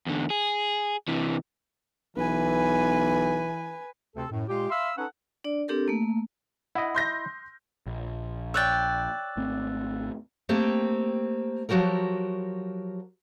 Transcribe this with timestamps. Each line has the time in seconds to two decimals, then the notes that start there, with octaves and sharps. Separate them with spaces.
0.06 E2 D3
0.30 G#4
1.08 C3 E3
2.17 B1 E3 B4 G#5
4.16 D2 C3 C4 A4
4.30 F#2 A2
4.48 A#2 G#3 F4 G4
4.70 E5 F5 B5 C6 E6
4.97 C#4 D#4 A4 B4 F#5
5.44 D4 D5
5.68 C4 D4 G4 A4 A#4
5.88 A3 A#3
6.75 E4 D#5 F#5
6.95 C6 G6 A#6
7.87 A#1
8.54 C#5 D5 G5 E6 F#6 A6
9.37 G#1 A3 C4
10.49 A3 A#3 C4 G4
11.69 F3 F#3 F#4 G4 A#4